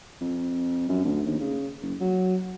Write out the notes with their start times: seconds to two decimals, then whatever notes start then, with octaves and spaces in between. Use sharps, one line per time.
0.21 F2
0.89 F#2
1.04 D2
1.26 D#2
1.40 C#3
1.82 F#1
2.01 F#3